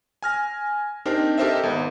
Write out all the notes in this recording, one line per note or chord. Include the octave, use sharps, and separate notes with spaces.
G#5 F6 A#6
C4 D4 D#4 G4 A#4 C5
G4 A4 A#4 C5 D#5 E5
G#1 B3